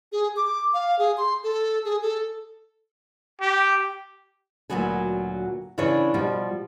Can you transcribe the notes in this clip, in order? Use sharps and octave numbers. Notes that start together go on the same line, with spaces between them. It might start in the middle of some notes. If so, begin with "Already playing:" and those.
G#4
D6
F5
G#4
C6
A4
G#4
A4
G4
D2 A#2 F#3 B3 G#5
C#3 E3 D4 B4 C#5
B2 F3 G3